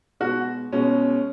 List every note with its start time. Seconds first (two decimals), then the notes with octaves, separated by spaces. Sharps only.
0.20 B2 G#3 F#4
0.72 B2 G#3 C#4